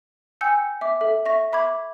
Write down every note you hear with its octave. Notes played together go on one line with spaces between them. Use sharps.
G5 G#5 E6 G6 C#7
E5 D6
A4 E5
E5 C#6 A#6
E5 B5 D6 G#6